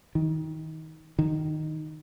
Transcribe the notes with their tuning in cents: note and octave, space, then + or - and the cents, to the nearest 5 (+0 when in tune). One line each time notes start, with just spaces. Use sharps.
D#3 +25
D#3 -10